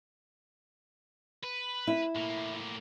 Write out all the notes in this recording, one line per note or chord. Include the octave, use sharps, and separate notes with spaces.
B4
E4
A2 A#3